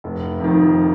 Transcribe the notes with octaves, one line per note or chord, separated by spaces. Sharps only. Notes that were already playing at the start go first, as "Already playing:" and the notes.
F1
F2 D#3